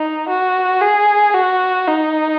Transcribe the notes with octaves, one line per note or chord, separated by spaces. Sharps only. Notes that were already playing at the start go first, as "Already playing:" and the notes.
Already playing: D#4
F#4
G#4
F#4
D#4